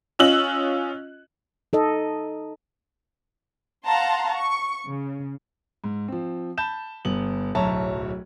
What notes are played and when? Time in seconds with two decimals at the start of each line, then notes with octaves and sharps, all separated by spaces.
0.19 C#4 F4 D#5 E6 F#6 F#7
1.73 D#4 A4 D#5
3.85 F5 F#5 A5 A#5 C6
4.33 C#6
4.86 C#3
5.84 G#2
6.08 F3 C4
6.58 A5 B5 G6 E7
7.05 G1 B3 F#7
7.55 D1 B1 C#5 E5 A5 A#5